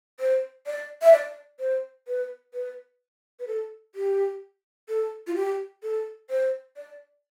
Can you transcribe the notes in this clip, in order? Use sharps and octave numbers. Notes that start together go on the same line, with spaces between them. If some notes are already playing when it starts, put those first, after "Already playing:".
C5
D5
E5
D5
C5
B4
B4
B4
A4
G4
A4
F4
G4
A4
C5
D5